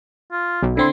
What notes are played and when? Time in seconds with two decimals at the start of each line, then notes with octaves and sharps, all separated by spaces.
0.32 F4
0.62 B1
0.77 D3 C4 E4 C6